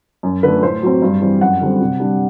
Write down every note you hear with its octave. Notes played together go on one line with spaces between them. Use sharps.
F#2
D3 A3 B4
A2 C5
F#3 C4
G2
E3 G3 C4
F#2 F#5
D3 G3 C4
C3
G3 D4